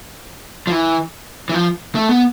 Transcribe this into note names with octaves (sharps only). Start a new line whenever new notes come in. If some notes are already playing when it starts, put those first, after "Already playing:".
F3
E3
E3
F3
A3
B3